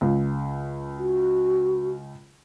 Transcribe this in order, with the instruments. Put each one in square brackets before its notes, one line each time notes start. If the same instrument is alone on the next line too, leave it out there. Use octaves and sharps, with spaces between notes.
[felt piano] C#2
[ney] F#4